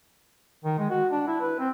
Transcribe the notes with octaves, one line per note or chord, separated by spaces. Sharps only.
D#3
G#3
F#4
D4
E4
B4
C4